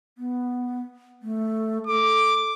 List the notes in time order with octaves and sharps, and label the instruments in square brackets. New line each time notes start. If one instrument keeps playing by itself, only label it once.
[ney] B3
A3
[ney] A4 [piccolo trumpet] D6